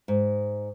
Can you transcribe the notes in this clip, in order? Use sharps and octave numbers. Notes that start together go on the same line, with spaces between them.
G#2